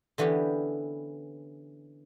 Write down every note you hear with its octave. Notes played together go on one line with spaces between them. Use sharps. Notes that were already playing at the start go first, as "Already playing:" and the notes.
D3 E3 B3 C#4 G4